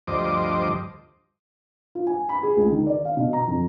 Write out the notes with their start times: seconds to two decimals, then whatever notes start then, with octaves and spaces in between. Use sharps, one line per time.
0.07 D2 G2 F3 C5 D#5 D6
1.95 F4
2.07 G#5
2.29 B5
2.43 G#4
2.57 C#2
2.71 D#3
2.86 D5
3.05 F5
3.17 B2
3.33 A#5
3.47 F2